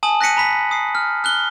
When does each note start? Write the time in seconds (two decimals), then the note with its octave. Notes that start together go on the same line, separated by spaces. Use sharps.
0.03 G#5 A5 D#6 F#7
0.21 F#6 A#6 B6 C#7 D#7
0.37 A#5 B5 B6
0.71 D#6 C7
0.95 F6
1.24 F6 F#6 G7